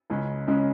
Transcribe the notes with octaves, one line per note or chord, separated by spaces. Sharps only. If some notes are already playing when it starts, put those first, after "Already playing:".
C#2 C#3 G#3 C#4
C#2 C#3 G#3 C#4